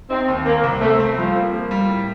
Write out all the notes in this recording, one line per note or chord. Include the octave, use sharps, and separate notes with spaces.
C4 D#4
D#2
A#3 C4
C2
A3 C4
C4
F3 G3
A#3
A#3
G3
A2